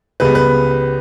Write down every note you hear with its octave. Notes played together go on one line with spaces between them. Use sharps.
C#2 C#3 G3 B3 B4
B4